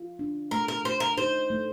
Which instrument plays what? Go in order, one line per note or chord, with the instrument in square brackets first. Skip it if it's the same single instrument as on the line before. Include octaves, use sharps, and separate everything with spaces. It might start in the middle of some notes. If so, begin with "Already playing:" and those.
Already playing: [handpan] F4
D4
[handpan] A3 [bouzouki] A#4
[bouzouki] A#4
[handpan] A3 [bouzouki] C5
[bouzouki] A#4
[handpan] D#4 [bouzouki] C5
[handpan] A3